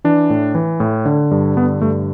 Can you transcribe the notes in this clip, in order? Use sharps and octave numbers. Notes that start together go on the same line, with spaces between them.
E3 D4
A2
E3
A2
D3
G2
D3 B3
G2 A3